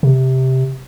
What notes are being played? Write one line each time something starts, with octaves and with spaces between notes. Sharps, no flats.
C3